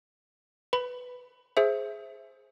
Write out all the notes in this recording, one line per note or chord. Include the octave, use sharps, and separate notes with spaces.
B4 B5
G#4 C5 E5